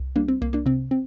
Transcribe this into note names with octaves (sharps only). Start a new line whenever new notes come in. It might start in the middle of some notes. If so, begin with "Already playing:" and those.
Already playing: C2
G3 A#3 D4
C4
C2 A#3
A#3 D4
C3 C4
C4